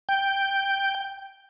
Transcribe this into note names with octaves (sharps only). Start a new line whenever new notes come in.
G5